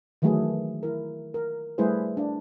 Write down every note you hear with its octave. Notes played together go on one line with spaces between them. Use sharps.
D#3 E3 F#3 A3 G#4 B4
E4 A#4
A#4
G3 A3 E4 G#4 B4 C5
D4